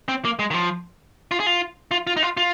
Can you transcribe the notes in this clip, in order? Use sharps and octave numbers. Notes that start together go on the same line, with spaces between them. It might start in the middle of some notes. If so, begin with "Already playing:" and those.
C4
A#3
G#3
D#3
F3
F4
G#4
F4
F4
F4
D#4
F4
F4